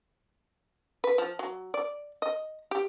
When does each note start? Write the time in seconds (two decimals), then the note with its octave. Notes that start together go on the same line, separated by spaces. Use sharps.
1.04 B4
1.18 F3
1.39 F#3
1.74 D5
2.22 D#5
2.71 G4